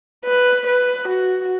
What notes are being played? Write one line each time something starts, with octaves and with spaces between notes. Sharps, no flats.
B4
B4
F#4